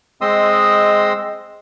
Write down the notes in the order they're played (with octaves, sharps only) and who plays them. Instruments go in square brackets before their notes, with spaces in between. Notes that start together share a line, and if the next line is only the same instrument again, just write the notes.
[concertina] G#3 C4 D#5 C6 D#6 E6